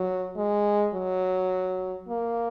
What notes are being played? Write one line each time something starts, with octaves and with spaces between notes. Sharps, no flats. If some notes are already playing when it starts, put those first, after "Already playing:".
Already playing: F#3
G#3
F#3
A#3